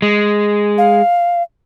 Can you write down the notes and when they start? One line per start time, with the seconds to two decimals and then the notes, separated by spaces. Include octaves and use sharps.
0.02 G#3
0.78 F5